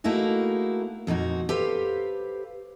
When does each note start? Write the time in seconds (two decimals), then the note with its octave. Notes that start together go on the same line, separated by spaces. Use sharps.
0.04 A3 A#3 D#4 E4 F#4 G#4
1.07 F2 A#2 D#4 F#4
1.49 G4 A4 B4 C5 F5